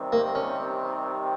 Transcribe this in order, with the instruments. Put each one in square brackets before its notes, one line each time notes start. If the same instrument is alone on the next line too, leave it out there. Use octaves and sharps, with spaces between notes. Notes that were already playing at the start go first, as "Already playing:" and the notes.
Already playing: [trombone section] C3 D#3 G3 C4
[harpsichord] A#3
C#4